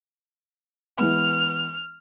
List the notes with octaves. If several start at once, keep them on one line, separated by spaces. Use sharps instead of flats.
E3 G#3 B3 F6